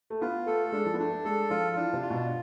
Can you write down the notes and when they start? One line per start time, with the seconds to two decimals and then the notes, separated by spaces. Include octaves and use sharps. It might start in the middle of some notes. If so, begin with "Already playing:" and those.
0.10 A3
0.21 B3 F4
0.46 A3 A4
0.65 A3
0.72 G#3 D4
0.85 F3
0.94 B3
0.99 A3 D4
1.12 A3
1.25 G#3 A4
1.50 F3 F4
1.76 E3 D4
1.93 C3
2.02 F4
2.10 B2